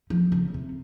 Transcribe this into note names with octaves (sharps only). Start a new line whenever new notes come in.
F3
C#3
C3